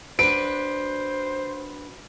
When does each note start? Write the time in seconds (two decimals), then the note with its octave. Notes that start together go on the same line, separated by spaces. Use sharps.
0.19 D4 F#4 B4 C5 D7